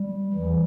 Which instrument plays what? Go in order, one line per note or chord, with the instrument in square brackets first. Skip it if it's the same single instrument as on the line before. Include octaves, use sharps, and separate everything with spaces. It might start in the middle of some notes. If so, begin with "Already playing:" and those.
Already playing: [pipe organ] G3
E2 E3 G3